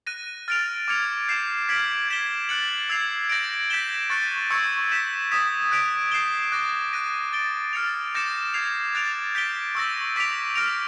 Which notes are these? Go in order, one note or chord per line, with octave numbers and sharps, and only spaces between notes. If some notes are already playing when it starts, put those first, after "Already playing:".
F#6 A#6 D#7
F6 A6 D7 F7
D6 F6 G#6 C#7 F7
G6 C7 E7
F6 G#6 B6 D7 F#7
G#6 B6 E7 G7
F#6 A6 C#7 F#7
E6 G#6 C7 F7
G6 A#6 D7
G6 B6 E7 G7
C#6 F#6 A6 C#7
C#6 E6 G#6 C#7
G6 B6 E7
D#6 G#6 B6 E7
F#6 B6 D7 F7
G6 C7 E7 G7
D6 F#6 A#6
F#6 A#6 D#7
A6 D7 G7
F6 A6 C#7 F7
D6 G6 A#6 C#7 E7
G#6 C7 F7
F#6 A6 D7 F7
G6 B6 D7 G7
C#6 E6 G6 A#6
D6 G6 B6 D7 F7
F6 A#6 D7 F7